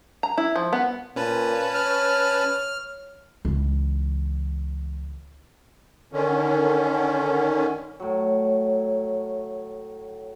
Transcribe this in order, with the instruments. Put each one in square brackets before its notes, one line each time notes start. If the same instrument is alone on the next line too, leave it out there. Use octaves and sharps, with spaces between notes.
[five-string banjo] A#5
E4
F3
B3
[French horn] A#2 [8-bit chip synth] C#4 B4 A5
[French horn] C#5 [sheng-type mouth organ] F6
[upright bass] C#2 E3
[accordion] D3 D#3 C#4
[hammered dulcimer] A2 F#3